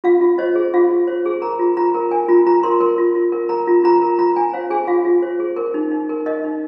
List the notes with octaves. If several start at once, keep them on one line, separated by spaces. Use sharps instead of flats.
F4 F5
F4
C5 D#5
G#4
F4 F5
F4
C5
G#4
A#4 A#5
F4
F4 A#5
A#4
A#4 G#5
F4 A#5
F4 A#5
A#4 C6
A#4
F4
F4
A#4
A#4 A#5
F4
F4 A#5
A#4
F4 A#5
F4 G#5
C5 F5
G#4 G#5
F4 F5
F4
C5
G#4
A#4
D#4
D#4
A#4
A#4 D#5
D#4